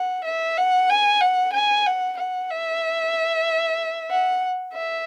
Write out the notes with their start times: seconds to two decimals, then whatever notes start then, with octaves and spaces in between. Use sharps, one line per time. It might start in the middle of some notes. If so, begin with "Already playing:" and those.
Already playing: F#5
0.25 E5
0.58 F#5
0.90 G#5
1.21 F#5
1.54 G#5
1.86 F#5
2.18 F#5
2.50 E5
4.10 F#5
4.73 E5